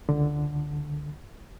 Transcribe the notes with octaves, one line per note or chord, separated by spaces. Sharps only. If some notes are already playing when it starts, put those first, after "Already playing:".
C#2 D3